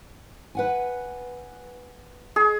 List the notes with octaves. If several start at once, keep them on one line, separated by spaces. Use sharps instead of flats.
B4 F#5 G#5
G#4